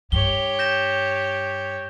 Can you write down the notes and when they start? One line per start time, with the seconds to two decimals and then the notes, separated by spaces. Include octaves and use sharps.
0.12 G2 G4 C#5 G7
0.59 G6 A#6 E7